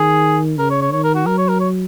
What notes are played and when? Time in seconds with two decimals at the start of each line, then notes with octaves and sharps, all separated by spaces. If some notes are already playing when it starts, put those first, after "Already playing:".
Already playing: D#3 G#4
0.58 C#3 A#4
0.70 C#5
0.81 C#5
0.92 D#3 C#5
1.04 A#4
1.15 F#4
1.26 F#3 A#4
1.38 C#5
1.49 A#4
1.60 C#5